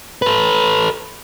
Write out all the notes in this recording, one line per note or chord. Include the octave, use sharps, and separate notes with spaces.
A4 B4